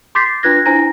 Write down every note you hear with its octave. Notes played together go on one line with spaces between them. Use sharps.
C6 D6 G6 A6 B6 C7
D4 F4 B4 F#6 G#6 A#6
D4 E4 C5 G#5 A#5 A#6